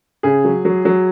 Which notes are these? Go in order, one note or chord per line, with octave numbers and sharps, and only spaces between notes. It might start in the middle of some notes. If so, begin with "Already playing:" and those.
C#3 G#4
F#3
F#3
F#3